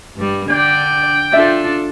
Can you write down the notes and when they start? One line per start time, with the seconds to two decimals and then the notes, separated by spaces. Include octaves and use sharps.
0.16 G2 G3
0.50 D3 D4 D5 G5
1.32 D4 F4 A4 D5 E5